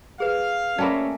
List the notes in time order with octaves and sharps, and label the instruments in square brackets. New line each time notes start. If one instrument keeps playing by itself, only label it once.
[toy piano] G#4 B4 [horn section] F5
[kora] A3 A#3 E5 [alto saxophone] C#4 [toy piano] D5 G5 B5